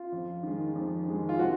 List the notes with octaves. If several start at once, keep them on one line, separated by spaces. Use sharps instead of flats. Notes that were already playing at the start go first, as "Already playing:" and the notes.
Already playing: F4
F2
D#3 G#3
F2
D#3 G#3
F4
C3 F#4